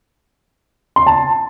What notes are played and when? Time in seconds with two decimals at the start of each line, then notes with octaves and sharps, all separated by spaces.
0.96 C6
1.06 A5